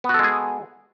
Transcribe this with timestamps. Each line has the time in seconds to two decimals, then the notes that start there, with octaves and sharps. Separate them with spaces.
0.04 B3
0.09 F#4
0.14 A4
0.19 G#3
0.24 G#4